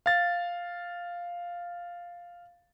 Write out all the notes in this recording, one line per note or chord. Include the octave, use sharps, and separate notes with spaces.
F5 A6